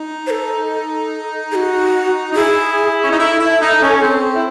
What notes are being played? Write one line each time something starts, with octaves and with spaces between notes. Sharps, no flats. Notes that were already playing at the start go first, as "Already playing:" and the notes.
Already playing: D#4
C5
A4
A4
G#4
F#4
D#4
E4 G#4
C#4
D#4
E4 A4
E4
D#4
C#4
C4
E4